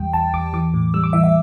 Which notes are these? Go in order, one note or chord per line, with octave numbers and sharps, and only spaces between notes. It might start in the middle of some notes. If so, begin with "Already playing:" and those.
Already playing: E2 G3 G5
E2 A5
E2 D6
E3 D6
A2
G3 E6
D6
E3 E5
E5